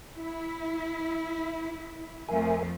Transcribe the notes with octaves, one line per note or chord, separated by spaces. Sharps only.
E4
F2 F3 A3 A#4 E5 G#5